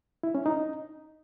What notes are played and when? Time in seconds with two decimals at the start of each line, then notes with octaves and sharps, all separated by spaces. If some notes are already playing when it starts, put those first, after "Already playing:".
0.23 E4
0.35 C#4
0.46 D#4